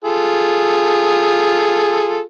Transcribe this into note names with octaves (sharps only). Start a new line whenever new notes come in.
F4 G#4 A4